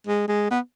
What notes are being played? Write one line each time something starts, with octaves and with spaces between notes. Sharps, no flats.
G#3
G#3
B3